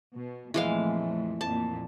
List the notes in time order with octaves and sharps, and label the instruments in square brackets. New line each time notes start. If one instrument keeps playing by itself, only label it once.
[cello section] B2
[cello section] F2 A#2 A3 [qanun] E3 G#3 F5
[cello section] F2 A#2 [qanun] A5